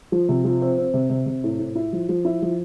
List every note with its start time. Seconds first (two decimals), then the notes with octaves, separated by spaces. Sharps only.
0.12 F3
0.29 C3
0.45 F3
0.62 C4
0.78 C4
0.94 C3
1.10 C3
1.26 C3
1.44 A2
1.59 A2
1.75 E4
1.93 F3
2.09 F3
2.25 E4
2.42 F3